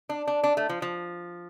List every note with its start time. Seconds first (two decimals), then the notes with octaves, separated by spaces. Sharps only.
0.09 D4
0.27 D4
0.43 D4
0.57 A3
0.69 F3
0.82 F3